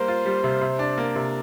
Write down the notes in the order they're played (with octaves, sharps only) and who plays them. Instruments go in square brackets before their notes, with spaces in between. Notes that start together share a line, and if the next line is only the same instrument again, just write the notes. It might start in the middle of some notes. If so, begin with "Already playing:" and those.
Already playing: [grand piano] G3 A#3 [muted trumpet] C5
[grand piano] F4
G3
C3
C3
D4
A#3
C3